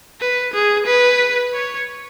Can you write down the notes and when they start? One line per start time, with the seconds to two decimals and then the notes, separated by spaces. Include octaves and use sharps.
0.21 B4
0.54 G#4
0.86 B4
1.54 C#5